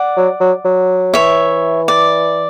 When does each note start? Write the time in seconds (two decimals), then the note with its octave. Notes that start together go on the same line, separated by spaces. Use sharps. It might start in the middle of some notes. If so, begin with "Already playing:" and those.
Already playing: D5 F#5
0.16 F#3
0.40 F#3
0.64 F#3
1.14 E3 C#5 E5
1.88 D5